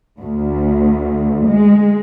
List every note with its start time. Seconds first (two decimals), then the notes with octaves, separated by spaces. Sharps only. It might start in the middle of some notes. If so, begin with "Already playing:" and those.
0.21 D2
1.46 G#3